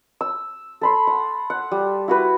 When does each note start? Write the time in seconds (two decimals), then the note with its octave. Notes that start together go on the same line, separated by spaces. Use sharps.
0.21 E6
0.81 A4 B5 C6
1.07 F#5
1.50 F#5
1.72 G3
2.08 E4 F#4 B4